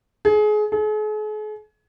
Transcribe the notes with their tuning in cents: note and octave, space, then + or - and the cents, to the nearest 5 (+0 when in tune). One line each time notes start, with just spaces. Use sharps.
G#4 +30
G#4 +45